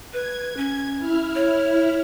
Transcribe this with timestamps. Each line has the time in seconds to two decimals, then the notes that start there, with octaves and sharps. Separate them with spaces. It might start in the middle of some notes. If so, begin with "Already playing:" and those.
0.13 B4 G#6
0.57 C#4
0.98 E4 F6
1.35 C#5